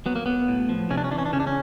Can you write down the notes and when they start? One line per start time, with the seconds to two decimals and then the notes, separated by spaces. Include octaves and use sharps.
0.06 F#3 B3
0.15 A#3
0.26 F#3 B3
0.48 A2
0.69 F3
0.90 C3 C#4
0.97 D4
1.04 C#4
1.11 E3 D4
1.18 C#4
1.26 D4
1.33 C#3 C#4
1.40 D4
1.47 C#4